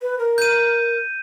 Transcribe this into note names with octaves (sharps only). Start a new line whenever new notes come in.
B4
A#4
G6 D#7